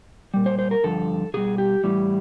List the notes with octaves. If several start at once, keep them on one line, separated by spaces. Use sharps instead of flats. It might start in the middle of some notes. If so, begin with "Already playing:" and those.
A#2 G3
C5
C5
A#4
G2 D3 F3 A4
B2 G3 G#4
G4
A2 E3 G3